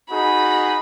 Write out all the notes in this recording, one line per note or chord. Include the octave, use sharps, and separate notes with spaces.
D#4 F#4 G#4 B5